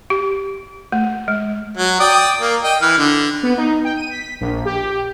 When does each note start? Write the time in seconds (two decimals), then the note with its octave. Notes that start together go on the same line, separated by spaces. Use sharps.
0.10 G4
0.92 A3
1.28 G#3
1.77 F#3
2.00 D5 G5 D#6
2.40 A#3
2.64 D#5 G5
2.82 E3 F6
2.98 D3
3.43 B3
3.57 D#4
3.85 G5
3.97 D#7
4.10 B6
4.41 A#1
4.66 G4